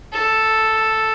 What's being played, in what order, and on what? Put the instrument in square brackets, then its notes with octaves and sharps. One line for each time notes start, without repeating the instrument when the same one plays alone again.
[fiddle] A4